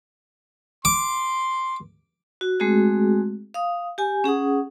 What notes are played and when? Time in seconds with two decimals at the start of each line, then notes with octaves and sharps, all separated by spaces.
0.85 C6 D6
2.41 F#4
2.60 G#3 A3 C4 F#4 G#4
3.54 F5 D#6
3.98 G4 G#5
4.24 C#4 G#4 F#5 D#6